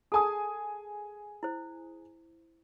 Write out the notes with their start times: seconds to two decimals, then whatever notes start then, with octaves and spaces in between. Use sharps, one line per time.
0.12 G#4 A4 G#5 A5 D#6
1.43 E4 C5